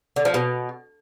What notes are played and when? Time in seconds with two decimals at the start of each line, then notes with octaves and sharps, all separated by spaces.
0.16 D3
0.25 F3
0.34 B2